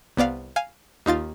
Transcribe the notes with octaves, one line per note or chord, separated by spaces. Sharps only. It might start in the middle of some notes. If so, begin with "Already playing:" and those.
C2 B3 D5 F5
F5 G#5
D#2 D#4 F4 A6